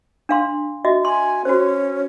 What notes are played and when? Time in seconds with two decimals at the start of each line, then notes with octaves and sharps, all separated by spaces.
0.29 D4 F5 C6
0.85 F#4 D#5 E5
1.05 G#5 C6
1.45 C#4 F#4 C5